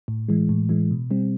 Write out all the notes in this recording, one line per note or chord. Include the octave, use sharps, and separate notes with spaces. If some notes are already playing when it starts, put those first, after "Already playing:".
A2
E3 G#3
A2
E3 G#3
B2
G3 C4